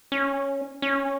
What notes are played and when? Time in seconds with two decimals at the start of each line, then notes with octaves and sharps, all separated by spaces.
0.12 C#4
0.82 C#4